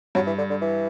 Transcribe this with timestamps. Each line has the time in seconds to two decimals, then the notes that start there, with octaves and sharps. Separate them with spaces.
0.15 G2 F#3
0.27 E3
0.38 D3
0.50 D3
0.61 E3